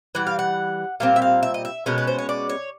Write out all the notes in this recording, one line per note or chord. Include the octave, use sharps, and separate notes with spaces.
E3 G3 F#5
F5
F#5
A#2 G3 C4 F5
E5
F5
E5
D#5
E5
B2 G#3 C#4 A#4
B4
C5
C#5
D5
C#5